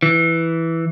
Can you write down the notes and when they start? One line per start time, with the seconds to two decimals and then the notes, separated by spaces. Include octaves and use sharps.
0.02 E3